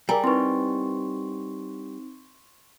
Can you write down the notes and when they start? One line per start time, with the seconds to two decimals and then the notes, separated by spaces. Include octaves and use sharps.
0.09 G3 G#4 A#4 G#5 A#5
0.24 C4 D#4 E4 B4 C6 C#6